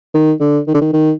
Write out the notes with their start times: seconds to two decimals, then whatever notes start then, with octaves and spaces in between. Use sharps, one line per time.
0.14 D#3
0.40 D3
0.68 D#3
0.74 D3
0.81 D#3
0.93 D#3